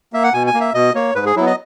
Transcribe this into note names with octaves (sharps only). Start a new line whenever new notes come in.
A#3 E5
F#5
B2 G#5
G#5
A#3
E5
B2 D#5
A#3 C#5
G#2 B4
G#4
F#3 B3 E4
D#5